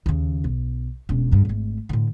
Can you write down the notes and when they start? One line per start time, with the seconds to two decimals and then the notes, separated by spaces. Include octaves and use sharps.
0.06 D#2 C#3
0.44 B1
1.09 E1 C#4
1.31 G2 C#3
1.45 G#1 A3
1.89 A2 D3